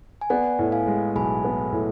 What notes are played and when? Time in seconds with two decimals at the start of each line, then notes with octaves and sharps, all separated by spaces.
0.21 G#5
0.30 B3 D5 F#5
0.59 A2
0.72 F5 G#5
0.87 G#3
1.15 B1 G#5 B5
1.44 B3
1.72 A2